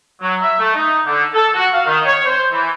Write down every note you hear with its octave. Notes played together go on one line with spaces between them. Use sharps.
F#3
E5
A3
D#4
D3
A4
F#4
F5
D#3
C#5
C5
E3